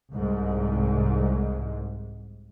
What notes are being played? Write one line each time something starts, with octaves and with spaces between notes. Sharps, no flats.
C2 G#2